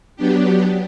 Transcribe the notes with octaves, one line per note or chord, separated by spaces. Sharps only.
F#3 B3 D4 G4